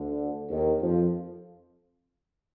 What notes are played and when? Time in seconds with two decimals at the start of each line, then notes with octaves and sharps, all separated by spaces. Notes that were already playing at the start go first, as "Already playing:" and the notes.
Already playing: D2 D3
0.49 D#2 D#3
0.82 F2 F3